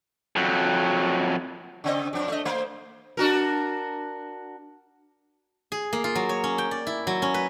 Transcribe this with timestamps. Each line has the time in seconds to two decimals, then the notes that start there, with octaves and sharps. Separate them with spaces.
0.36 F2 F#3
1.84 C#3 C4 D#5
2.13 F2 D4
2.28 A3 D#5
2.45 A3 C5
3.17 D4 F#4 A#4
5.72 G#4
5.93 A#3
6.04 F4
6.15 F#3
6.29 C#5
6.44 C#4
6.58 G5
6.71 D5
6.87 E4
7.07 F#3
7.22 C#4
7.34 B4